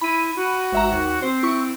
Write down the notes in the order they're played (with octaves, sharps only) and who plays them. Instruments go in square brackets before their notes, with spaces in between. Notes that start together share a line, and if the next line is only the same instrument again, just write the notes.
[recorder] E4 [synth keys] B5 D#7
[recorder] F#4
[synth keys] G#1 E5 A#5
D#2
[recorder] C4 [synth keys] C5
[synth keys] E4 C#6